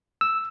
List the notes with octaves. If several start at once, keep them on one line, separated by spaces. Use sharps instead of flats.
E6